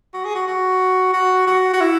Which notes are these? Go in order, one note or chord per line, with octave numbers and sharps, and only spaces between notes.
F#4
G#4
F#4
F#4
F#4
F#4
F#4
E4